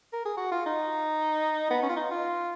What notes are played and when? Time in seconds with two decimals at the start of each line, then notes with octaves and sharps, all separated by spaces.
0.13 A#4
0.25 G#4
0.37 F#4
0.51 F4
0.66 D#4
1.70 B3
1.82 C#4
1.89 F4
1.96 D#4
2.11 F4